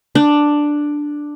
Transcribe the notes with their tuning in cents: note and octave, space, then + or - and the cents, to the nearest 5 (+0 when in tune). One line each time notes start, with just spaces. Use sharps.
D4 +5